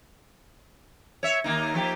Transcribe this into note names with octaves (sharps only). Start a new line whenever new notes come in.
C#5 E5
D#2 A#3 D#4
F3 A#3 G4